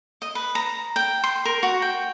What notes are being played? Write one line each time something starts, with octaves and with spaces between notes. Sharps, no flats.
D#5
B4
A#5
G5
C6
A#4
F#4
G5